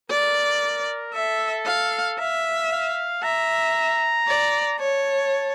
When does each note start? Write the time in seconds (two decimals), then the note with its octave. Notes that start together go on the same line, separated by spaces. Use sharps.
0.10 A#4 D5
1.14 A4 E5
1.66 F5
2.19 E5 F5
2.71 F5
3.23 E5 A#5
4.28 D5
4.79 C#5 A5